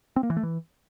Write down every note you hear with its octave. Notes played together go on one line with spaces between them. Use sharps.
C4
A#3
E3
A3
E3